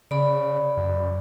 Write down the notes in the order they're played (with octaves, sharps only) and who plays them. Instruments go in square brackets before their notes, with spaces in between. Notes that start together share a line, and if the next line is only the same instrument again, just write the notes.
[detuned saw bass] C#3 [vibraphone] D5 B5
[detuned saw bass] F#2